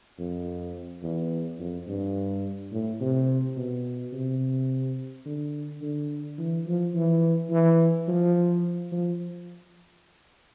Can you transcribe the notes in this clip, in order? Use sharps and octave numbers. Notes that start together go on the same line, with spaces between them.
F2
E2
F2
G2
A2
C3
B2
C3
D3
D3
E3
F3
E3
E3
F3
F3